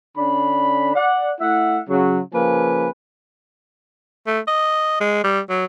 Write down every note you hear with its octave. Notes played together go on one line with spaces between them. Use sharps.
D3 C#4 D4 B5
D5 F#5
A3 E4 E5 F#5
C#3 F#3
C#3 F3 A#3 B4 G#5
A3
D#5
G#3
G3
F#3